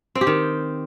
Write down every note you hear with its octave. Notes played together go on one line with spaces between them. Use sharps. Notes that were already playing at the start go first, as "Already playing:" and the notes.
C4
G4
D#3